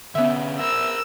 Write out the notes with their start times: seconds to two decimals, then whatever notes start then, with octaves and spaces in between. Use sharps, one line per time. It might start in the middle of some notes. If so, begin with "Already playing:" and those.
0.15 D3 B3 C#4 E5
0.60 A#4 C5 E6